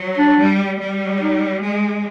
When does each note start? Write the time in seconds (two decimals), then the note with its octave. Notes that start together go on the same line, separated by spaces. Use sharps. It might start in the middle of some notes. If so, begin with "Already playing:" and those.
Already playing: F#3
0.18 D4
0.39 G3
0.80 G3
1.20 D#4
1.61 G#3